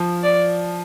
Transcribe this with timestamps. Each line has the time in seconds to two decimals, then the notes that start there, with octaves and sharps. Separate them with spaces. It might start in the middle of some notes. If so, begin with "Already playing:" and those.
Already playing: F3
0.23 D5